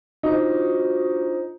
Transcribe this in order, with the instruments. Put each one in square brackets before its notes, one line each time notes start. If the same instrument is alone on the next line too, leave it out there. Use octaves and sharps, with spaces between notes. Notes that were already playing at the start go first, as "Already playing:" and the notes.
[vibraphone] D4 F4 C5 [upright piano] D#4 [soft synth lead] F#4